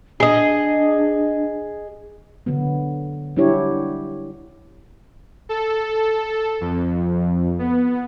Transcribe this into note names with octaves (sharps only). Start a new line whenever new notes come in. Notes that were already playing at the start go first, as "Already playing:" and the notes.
D4 G#4 D#5
D3 F#3 B3
F#3 G3 D4 E4 G4 C#5
A4
F2
B3